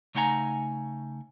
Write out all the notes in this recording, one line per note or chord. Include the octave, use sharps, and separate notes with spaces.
C#3 A3 D#4 F#5 G#5 A#5